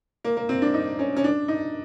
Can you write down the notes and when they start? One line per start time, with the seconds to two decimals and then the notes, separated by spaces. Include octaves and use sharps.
0.24 A#3
0.37 A#3
0.49 C4
0.62 D4
0.74 D#4
0.99 C#4
1.16 C#4
1.24 D4
1.48 D#4